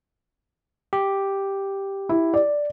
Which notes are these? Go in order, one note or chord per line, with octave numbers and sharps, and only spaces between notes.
G4
E4
D5